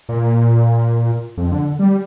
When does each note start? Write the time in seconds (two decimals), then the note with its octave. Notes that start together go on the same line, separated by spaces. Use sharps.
0.09 A#2
1.37 F2
1.52 D3
1.79 G3